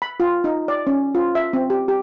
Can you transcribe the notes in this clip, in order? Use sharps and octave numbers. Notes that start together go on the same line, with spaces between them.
B5
F4
D#4
D5
C#4
F4
E5
C4
G4
G4